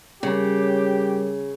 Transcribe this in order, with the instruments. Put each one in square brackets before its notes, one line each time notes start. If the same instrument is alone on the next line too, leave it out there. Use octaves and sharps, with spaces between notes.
[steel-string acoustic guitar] C#3 [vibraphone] G3 A#4 C#5 [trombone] G4